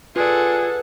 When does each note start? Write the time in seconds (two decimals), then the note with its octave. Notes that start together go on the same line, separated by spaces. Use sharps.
0.16 F4 G#4 A4 B4 D5 F#5